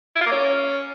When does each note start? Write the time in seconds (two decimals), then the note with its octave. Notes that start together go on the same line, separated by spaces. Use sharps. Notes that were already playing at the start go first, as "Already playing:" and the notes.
0.16 E4
0.21 F4
0.26 A#3
0.31 C#4